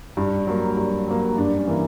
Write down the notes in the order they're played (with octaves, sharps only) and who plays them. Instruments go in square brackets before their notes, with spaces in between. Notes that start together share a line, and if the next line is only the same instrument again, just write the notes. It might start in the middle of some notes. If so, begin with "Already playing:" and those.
[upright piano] G2
F#3 A#3
G2
F#3 A#3
G2 D4
C#4
E3 A#3